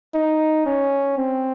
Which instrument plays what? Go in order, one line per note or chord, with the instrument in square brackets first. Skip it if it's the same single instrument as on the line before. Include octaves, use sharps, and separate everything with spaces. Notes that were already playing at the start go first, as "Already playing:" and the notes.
[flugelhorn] D#4
C#4
C4